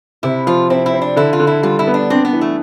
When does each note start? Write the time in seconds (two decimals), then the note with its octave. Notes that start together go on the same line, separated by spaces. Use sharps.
0.23 C3 E4
0.47 F3 F4
0.70 C4 E4
0.86 E4
0.94 C4
1.02 D4
1.16 D3 E4
1.33 F4
1.40 D3
1.47 E4
1.63 G3 F4
1.79 E4
1.87 B3
1.94 D4
2.10 C4 D4
2.25 B3
2.33 E3
2.41 A3